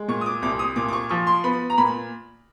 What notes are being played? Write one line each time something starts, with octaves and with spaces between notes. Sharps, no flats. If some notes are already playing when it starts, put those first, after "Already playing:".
Already playing: G#3
A#2 C#6
D#6
D6
C2 D6
D#6
A#2 D6
D6
C#6
F3 C#6
C6
B3 B5
A#5
A#2 B5